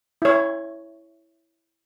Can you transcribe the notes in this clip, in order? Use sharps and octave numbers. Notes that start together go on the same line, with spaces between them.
E4 C#5